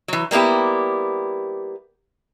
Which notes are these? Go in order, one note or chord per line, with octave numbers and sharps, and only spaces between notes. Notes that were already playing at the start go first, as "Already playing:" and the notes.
E3 F#3
G3 A#3 B3 E4 G4